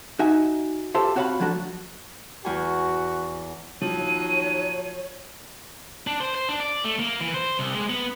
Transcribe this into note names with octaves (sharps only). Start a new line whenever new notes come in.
D#4 F#4 E5 G#5
F4 G4 A4 C5 E5
C4 F#4 C#5 E5 F5 B5
F3 F#3 A3 D4 F#4
E2 F#4 G#5
D#2 F3 F#3 C#5 D#7
D4
C5
C5
D4
D5
A3
A#3
E3
C5
C2
G#3
B3